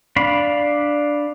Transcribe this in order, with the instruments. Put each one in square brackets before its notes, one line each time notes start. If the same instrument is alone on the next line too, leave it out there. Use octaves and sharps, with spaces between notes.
[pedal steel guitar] D4 F5 B5